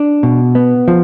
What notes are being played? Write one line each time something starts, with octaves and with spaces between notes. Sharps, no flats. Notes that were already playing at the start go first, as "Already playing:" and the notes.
Already playing: D4
B2
B3
F3